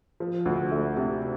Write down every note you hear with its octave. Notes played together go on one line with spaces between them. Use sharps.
F3
D2
A3
C3